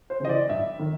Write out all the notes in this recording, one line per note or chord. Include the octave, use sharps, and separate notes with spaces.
C5
C#3 E3 D#5
D5
G2 E5
D#3